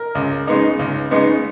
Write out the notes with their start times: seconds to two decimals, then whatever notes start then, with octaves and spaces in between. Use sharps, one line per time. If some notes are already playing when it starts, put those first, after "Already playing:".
Already playing: A#4
0.15 C#2
0.47 C#3 G#3 B3 D#4
0.79 C#2
1.11 C#3 G#3 B3 D#4